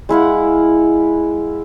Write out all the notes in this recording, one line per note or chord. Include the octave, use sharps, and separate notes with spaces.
G#3 E4 F5 F#5